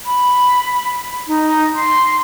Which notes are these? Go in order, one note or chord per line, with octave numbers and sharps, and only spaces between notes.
B5
D#4
C6